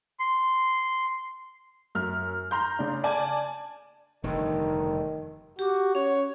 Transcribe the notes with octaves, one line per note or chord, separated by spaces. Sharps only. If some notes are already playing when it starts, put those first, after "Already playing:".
C6
F#2 F6
A#5 C6 G6
C#3 D4
D5 G#5 A5
F1 G2 D3 D#3
F#4 G4 D6
C#4 C#5